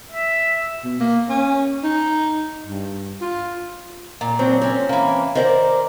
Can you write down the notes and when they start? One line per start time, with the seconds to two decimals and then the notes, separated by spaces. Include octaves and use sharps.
0.12 E5
0.84 B2
1.00 A#3
1.29 C#4
1.83 D#4
2.66 G2
3.21 F4
4.21 A#2
4.39 F#3 C4 D4
4.61 C4 C#4
4.89 E3 A#3
5.35 D#3 A#4 C5 D5